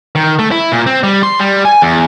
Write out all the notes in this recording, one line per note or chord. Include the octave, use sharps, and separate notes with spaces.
D#3
A3
E4
A#2
C4
G3
C6
G3
G#5
E2